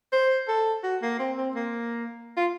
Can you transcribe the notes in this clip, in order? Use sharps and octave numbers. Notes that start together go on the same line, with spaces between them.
C5
A4
F#4
A#3
C4
C4
A#3
F4